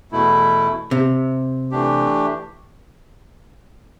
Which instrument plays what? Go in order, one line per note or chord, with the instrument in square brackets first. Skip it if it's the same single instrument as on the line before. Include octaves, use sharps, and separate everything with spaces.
[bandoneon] E2 B2 A3 E4
[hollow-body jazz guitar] C3
[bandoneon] E3 A3 D4 G4